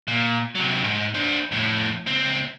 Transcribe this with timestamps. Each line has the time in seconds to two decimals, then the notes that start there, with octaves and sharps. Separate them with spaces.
0.08 A#2
0.55 C3 F#3
0.84 G#2
1.14 D4 C5
1.52 F2 A2
2.06 C#2 C4